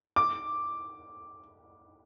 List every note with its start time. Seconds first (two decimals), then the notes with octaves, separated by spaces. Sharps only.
0.16 D6